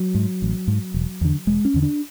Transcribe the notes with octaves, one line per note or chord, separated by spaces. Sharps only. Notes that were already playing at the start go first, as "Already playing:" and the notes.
Already playing: F#3
G#2
A1
G#2
E1
E2 D3
E1 G#3
C#4
E2 D3
D4